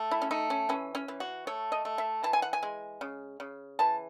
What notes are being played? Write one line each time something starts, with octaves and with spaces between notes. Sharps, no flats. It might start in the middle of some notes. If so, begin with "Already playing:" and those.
Already playing: A3
E4
C#4
A3 D#4
C#4
E3 C#4
C#4
E3
F#4
A3 C#5
D#5
A3
E5
E3 A5
G#5
F#5
G#5
G#3
C#3
C#3
E3 A5